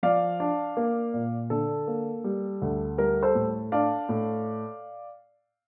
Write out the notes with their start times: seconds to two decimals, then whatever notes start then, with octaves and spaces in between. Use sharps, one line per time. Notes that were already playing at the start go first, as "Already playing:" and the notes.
0.03 F3 D5 F5
0.40 D4
0.77 A#3
1.14 A#2
1.50 D3 A4
1.87 A#3
2.24 G3
2.62 D2
2.98 G3 A#4
3.23 A4 C5
3.35 A2
3.72 D4 D5 F5
4.09 A2